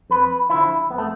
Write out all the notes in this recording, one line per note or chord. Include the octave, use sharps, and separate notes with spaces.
F2 B4
D3 F3 E4
F2 B3
A3